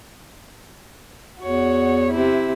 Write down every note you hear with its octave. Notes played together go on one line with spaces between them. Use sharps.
E2 F#4 C#5
C3 E4